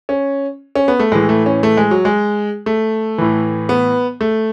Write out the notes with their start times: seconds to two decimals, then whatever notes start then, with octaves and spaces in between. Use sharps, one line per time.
0.09 C#4
0.76 C#4
0.88 B3
1.00 A3
1.12 A2 E3 G#3
1.29 A3
1.46 C#4
1.63 A3
1.77 G#3
1.91 F#3
2.05 G#3
2.66 A3
3.18 A2 E3
3.69 B3
4.21 A3